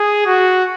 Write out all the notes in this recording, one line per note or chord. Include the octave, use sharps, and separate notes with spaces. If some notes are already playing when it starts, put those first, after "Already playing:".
Already playing: G#4
F#4